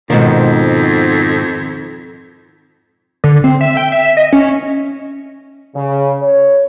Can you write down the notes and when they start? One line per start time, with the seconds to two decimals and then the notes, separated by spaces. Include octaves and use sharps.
0.10 F2 G#2 B2 D#3
3.24 D3
3.44 C4
3.61 E5
3.77 G5
3.92 E5
4.17 D#5
4.33 C#4
5.75 C#3
6.22 C#5